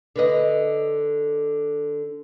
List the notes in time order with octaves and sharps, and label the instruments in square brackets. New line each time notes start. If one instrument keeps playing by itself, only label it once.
[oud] D3 B4 D#5